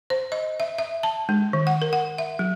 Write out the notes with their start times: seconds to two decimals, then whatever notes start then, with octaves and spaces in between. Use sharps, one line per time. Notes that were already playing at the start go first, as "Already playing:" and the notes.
0.10 C5
0.32 D#5
0.60 E5
0.78 E5
1.03 A5
1.29 G#3
1.53 D#3
1.67 F#5
1.82 A#4
1.93 F#5
2.18 E5
2.39 F#3